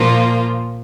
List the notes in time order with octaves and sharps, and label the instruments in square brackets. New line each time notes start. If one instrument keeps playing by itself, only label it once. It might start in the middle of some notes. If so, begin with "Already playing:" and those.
Already playing: [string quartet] A#2 F3 A#3 F4